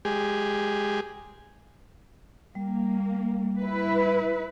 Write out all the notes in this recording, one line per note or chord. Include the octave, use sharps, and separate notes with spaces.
G#3 G4 G#4
G3 A#3
E4 B4